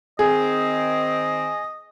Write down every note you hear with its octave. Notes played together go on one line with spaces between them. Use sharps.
D#3 C4 G#4 D#5